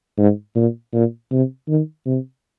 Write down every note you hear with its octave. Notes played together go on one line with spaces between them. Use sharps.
G#2
A#2
A#2
C3
D#3
C3